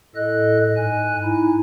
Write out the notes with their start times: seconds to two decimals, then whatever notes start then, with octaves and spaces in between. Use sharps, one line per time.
0.15 A2 A4 D#5 F#6
0.76 G#2 G#5 F#6
1.24 D#4 E4